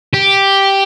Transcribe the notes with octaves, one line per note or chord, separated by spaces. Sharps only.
G4